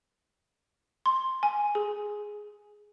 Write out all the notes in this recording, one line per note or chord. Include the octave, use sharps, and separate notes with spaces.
C6
G#5
G#4